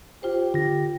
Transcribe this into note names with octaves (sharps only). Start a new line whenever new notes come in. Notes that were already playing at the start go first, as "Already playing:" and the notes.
F4 G4 C5
D3 F4 A#6